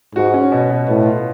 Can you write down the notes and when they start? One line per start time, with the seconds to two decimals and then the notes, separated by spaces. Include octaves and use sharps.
0.15 G#2 F#4
0.34 C#4
0.52 B2
0.70 B2
0.88 A2 B3
1.06 F4